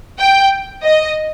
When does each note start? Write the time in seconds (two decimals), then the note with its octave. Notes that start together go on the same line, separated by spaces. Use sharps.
0.19 G5
0.84 D#5